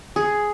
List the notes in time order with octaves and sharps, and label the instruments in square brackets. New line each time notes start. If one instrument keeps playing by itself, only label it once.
[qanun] G#4